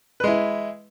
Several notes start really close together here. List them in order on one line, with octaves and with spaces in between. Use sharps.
B4 G#3 E4